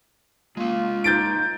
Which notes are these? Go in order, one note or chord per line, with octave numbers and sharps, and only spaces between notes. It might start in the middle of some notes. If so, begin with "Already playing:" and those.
G#3 A#3 F4 F5
D#4 G6 A6 D7